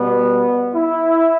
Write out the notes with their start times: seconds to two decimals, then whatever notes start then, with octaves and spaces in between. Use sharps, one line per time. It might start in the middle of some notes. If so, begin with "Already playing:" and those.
Already playing: B2 G3 B3
0.74 E4